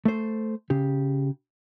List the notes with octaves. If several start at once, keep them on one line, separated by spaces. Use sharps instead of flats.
A3 C5
C#3 G4